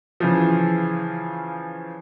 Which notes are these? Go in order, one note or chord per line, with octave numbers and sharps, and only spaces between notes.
C#3 E3 F3